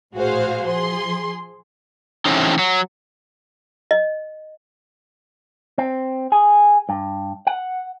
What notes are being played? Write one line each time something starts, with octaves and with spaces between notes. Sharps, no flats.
A#1 A2 F#4 G#4 C5 F5
F3 G#4 C6
E3 F#3 A3 C4 C#4 D#4
F#3
D#5
C4
G#4
G2
F#5